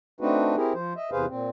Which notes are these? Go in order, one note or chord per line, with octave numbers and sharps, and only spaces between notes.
A3 C4 D4 D#4 F#4 B4
C4 E4 G4 G#4 A#4
F3 C5
D#5 E5
E2 C3 G#4 B4 C5 F5
A#2 C4